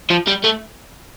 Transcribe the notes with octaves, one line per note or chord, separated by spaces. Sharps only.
F3
G3
A3